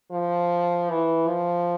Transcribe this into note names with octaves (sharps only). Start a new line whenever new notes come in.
F3
E3
F3